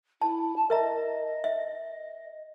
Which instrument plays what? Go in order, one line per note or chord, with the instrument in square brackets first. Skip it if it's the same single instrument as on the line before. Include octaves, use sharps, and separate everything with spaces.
[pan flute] E4 [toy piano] A5
[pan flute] A5
[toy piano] A#4 E5 A#5 [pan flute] D#5
[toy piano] E5